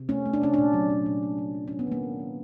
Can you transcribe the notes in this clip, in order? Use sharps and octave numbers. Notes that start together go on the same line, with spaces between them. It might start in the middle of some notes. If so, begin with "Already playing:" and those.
Already playing: C3
A3 C#4
A3
D4
C3 C#4
A#2 D4
F#3
A#2
A#2
A#2
F#3
F#3
F#3 C#4
B3
D#3 A#3
D#3
F#3